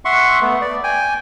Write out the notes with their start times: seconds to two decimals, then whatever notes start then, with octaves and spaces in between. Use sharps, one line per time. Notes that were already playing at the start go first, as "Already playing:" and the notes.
0.05 E5 F#5 C6 C#6
0.41 A3 B3
0.61 D5
0.84 G5 G#5